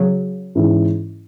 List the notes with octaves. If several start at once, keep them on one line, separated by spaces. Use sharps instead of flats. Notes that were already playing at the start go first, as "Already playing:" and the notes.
Already playing: C#3 F#3
G#2 E3 C#4 E4